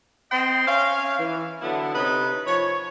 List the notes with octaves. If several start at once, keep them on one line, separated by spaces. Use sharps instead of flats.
C4 C5 D#5 G5 C6
C#4 C#5 E5 F5
E3
D3 F#3 B3 E4
C3 C#4 D#4 B4
F3 C#5